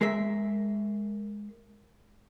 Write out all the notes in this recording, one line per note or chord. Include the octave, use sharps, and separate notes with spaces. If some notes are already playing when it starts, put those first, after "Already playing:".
G#3 G#4 A#4 E5